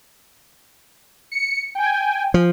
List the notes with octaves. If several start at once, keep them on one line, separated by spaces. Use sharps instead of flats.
C#7
G5 G#5
F3